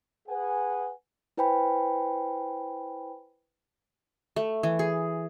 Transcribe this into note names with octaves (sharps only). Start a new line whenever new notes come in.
G#4 B4 F#5 G#5
E4 B4 C5 G5 G#5 B5
A3
E3
G#4